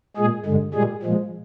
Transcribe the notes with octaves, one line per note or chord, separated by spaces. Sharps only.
A#2 G#3 G#4
G2 D3 G#3
A#2 G3 G#3 G#4
A#2 F3 G#3